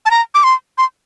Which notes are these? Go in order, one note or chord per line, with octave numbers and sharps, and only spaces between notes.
A5
A#5
D6
C6
C6